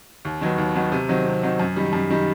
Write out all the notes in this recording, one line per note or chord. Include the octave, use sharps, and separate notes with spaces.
D#2
D#3 F#3 B3
D#2
D#3 F#3 B3
C3
D#3 F#3 C4
C3
D#3 F#3 C4
F#2
D#3 G3
F#2
D#3 G3